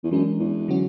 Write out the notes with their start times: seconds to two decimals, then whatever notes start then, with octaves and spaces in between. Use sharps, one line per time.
0.04 E2
0.11 F#2 E3 G#3 D4
0.40 E2
0.68 D3 F#3 C#4 F#4